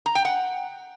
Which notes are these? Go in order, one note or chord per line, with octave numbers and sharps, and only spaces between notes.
A#5
G5
F#5